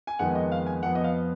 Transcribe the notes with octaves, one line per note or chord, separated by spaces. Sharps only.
G#5
F2 D#3 G#3 B3 F#5
D#5
F5
G#5
F2 F3 B3 F#5
D#5
F5